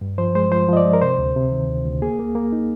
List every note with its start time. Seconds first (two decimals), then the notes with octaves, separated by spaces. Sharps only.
0.01 G2
0.18 F3 C5
0.35 G#3 C5
0.52 F3 C5
0.68 F3 D#5
0.77 D5
0.85 G#3
0.93 A#4
1.02 C3 C5
1.19 D2
1.36 C3
1.52 D#3
1.68 D2
1.85 D2
2.02 A#3 G#4
2.19 A#3
2.35 A#3
2.52 D#4